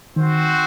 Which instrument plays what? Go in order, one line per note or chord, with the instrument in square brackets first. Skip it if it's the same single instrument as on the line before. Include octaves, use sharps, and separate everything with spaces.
[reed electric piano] D#3 [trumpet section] C4 F#4 C5